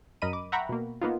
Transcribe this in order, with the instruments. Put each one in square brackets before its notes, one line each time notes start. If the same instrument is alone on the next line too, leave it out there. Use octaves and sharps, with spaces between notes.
[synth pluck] F#2 A#4 D#5 B5 D#7
D6
E5 F#5 G5 A#5 B5 C#6
B2 A#3
A#3 B3 D#4 F4